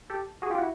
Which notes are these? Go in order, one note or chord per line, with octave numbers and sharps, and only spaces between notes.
G4 A4
F#4 G#4
F4 G4
E4 F#4